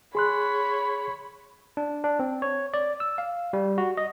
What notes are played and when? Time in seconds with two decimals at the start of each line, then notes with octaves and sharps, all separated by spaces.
0.15 G#4 C#5 B5 C6 F#6
1.77 D4
2.04 D4
2.19 C4
2.42 C#5
2.74 D5
3.00 E6
3.18 F5
3.53 G3
3.78 F#4
3.97 D#5